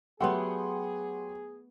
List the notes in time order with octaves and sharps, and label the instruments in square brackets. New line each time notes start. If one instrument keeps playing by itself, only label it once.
[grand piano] F#3 G4 [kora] A3 B3 [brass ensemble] G#4 [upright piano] F#5 G5 C6